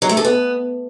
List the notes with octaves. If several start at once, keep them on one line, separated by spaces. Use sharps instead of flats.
F#3
A3
A4
B3